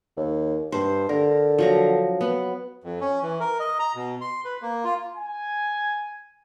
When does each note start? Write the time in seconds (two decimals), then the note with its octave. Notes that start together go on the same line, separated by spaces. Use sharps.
0.17 D#2
0.72 G2 C5
1.09 D3 A#4
1.59 F3 F#3 A#5
2.21 B3
2.84 F2
3.01 C#4
3.23 E3
3.40 A#4
3.60 D#5
3.79 A#5
3.95 B2
4.21 C6
4.45 B4
4.62 A#3
4.84 F4
5.16 G#5